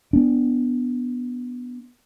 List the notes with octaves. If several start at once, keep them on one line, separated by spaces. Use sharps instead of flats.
B3 D4